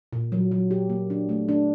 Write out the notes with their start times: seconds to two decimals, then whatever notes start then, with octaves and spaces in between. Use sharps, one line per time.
0.13 A#2
0.32 F#3
0.52 F#3
0.71 G4
0.90 A#3
1.10 D4
1.29 A3
1.49 D4